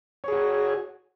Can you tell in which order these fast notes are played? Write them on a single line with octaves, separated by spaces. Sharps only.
C#5 G#4 F#4